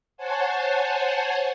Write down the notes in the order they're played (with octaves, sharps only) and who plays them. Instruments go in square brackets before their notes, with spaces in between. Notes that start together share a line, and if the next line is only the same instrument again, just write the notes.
[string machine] C5 C#5 F#5 G#5 A5